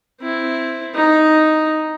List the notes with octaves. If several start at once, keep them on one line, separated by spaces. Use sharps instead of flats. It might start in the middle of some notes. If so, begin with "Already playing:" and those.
C4 E4
D#4